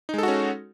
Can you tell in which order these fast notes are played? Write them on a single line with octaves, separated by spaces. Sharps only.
D#4 G#3 A4 F#4 C#4